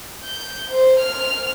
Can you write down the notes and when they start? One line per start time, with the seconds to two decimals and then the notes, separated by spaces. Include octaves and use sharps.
0.24 G6
0.70 C5
1.00 F6